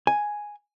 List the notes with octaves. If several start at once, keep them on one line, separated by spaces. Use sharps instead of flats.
G#5